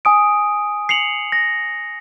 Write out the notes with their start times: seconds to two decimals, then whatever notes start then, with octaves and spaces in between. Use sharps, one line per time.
0.05 G#5 D#6 D7
0.89 C7 C#7 F7 F#7
1.32 A#6